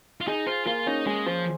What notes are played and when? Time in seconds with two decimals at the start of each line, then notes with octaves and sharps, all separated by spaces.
0.21 F4
0.27 D#4 G#4
0.46 F4 C5
0.66 A#3 F4
0.86 C#4 D#4
1.06 G#3 G#4
1.26 F3 C5